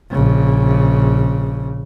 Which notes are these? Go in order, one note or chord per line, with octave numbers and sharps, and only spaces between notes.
A#1 C#3